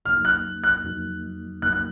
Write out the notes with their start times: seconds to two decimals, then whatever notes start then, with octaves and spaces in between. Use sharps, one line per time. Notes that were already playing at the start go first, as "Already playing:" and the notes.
0.05 F2 C#3 F#3 A#3 D#4 F6
0.25 F#6
0.64 F#6
0.84 F2 C#3 F#3 A#3 D#4
1.62 F2 C#3 F#3 A#3 D#4 F#6
1.73 F#6